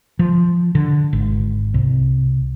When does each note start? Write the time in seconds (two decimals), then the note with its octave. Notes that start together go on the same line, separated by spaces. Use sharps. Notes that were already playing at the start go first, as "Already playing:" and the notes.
0.19 F3
0.75 D3
1.13 G#1
1.74 C2